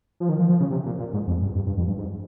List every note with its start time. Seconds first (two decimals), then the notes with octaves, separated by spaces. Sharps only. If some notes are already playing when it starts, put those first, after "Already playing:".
0.20 F3
0.29 D#3
0.39 F3
0.49 F3
0.60 C#3
0.71 C3
0.86 A#2
0.99 A#2
1.13 G#2
1.27 F2
1.42 G2
1.55 G2
1.66 G2
1.78 F2
1.88 G2
1.98 G#2